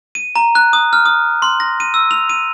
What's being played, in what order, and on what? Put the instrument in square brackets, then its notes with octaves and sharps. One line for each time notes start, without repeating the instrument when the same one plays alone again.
[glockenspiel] D#7
A#5
F#6
D#6
F6
D#6
C6
A#6
D#7
E6
F7
D#7